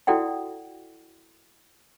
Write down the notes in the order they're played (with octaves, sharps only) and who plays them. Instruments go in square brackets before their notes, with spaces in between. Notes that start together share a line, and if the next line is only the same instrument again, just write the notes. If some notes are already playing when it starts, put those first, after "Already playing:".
[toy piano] E4 F#4 A4 D5 F#5 G5